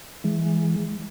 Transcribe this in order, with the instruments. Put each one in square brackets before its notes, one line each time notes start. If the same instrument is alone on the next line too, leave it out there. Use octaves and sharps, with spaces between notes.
[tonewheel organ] E3 G#3